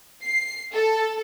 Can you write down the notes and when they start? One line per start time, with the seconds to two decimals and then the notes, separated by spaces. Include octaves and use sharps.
0.23 C7
0.73 A4